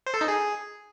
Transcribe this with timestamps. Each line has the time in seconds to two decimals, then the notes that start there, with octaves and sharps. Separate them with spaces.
0.06 C5
0.14 A4
0.21 D#4
0.28 G#4